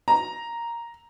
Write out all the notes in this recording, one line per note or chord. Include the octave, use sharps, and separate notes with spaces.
A#5